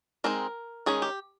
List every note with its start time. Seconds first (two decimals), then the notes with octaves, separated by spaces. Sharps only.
0.24 G#3 C4 D#4 A#4
0.86 D#3 G#3 C#4 G#4
1.02 G4